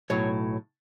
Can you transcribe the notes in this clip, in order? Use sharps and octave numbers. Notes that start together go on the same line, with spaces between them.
B1 A2 F#3 C#5